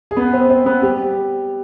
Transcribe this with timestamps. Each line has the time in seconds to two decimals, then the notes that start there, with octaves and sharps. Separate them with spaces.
0.11 G#4
0.16 B3 B4
0.33 C4 C5
0.50 C4 C5
0.66 B3 B4
0.82 G3 G4